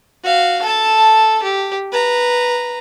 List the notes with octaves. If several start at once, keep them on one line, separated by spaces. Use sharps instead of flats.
F#4 F5
A4 A5
G4
B4 A#5